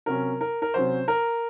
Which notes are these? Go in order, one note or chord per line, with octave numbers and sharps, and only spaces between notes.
C3 F#3 C#4 A#4
A#4
A#4
C3 F#3 C#4 C5
A#4